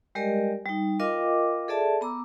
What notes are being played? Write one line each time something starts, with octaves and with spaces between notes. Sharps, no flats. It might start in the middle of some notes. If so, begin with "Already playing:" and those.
G3 G#3 G4 A#4 D5 D#5
G3 D#4
F4 A#4 D#5 F5 G5 D6
G#4 A4 D5 E5 A5
B3 A#5 D6 E6